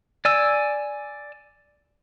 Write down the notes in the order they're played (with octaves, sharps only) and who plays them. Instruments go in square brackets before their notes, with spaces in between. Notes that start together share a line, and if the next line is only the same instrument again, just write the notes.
[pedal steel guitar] D5 G#5 E6